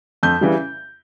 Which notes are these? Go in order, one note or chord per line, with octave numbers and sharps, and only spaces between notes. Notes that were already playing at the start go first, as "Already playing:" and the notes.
F2 G6
C#3 E3 G3